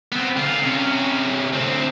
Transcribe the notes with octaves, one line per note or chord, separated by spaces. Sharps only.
B3 C4
D3 F4
C3 C#4
D2 C4